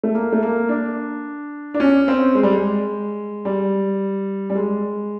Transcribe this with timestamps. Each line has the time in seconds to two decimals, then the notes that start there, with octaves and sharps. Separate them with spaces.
0.03 A3
0.15 A#3
0.32 A3
0.42 A#3
0.69 D4
1.74 D4
1.80 C#4
2.08 C4
2.35 G#3
2.43 G3
2.52 G#3
3.45 G3
4.50 G3
4.55 G#3